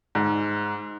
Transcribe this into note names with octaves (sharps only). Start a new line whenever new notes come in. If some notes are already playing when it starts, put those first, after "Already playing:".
G#2